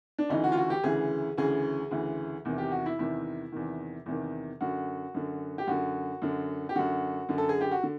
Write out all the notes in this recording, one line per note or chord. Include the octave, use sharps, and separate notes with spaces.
D4
D2 C#3 E3 D#4
F#4
F4
F#4
G4
D2 C#3 E3 G#4
D2 C#3 E3 G#4
D2 C#3 E3
E2 C3 D#3
G4
F#4
E4
E2 C3 D#3 E4
E2 C3 D#3
E2 C3 D#3
F#2 D3 F#4
F#2 D3
G4
F#2 D3 F#4
F#2 D3
G4
F#2 D3 F#4
F#2 D3
A4
G#4
G4
F#4
D3